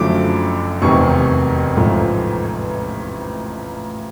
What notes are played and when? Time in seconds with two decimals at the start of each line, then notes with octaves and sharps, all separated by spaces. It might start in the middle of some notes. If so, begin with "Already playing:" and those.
Already playing: F#1 F#2 D3 F3 A3 D6
0.82 F1 E2 C3 D#3 C#6
1.77 A1 G#2 F3 A3